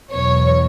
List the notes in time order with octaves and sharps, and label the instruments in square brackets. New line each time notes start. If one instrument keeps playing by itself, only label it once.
[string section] E2 B2 F#3 C#5